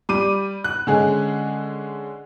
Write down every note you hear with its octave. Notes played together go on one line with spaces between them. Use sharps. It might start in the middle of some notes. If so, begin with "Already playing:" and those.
G3 D6 D#7
F#6
D3 G#3 C#4 G#4